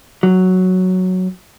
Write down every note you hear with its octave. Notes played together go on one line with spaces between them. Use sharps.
F#3